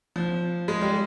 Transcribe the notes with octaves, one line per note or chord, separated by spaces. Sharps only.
F3
G#3
G3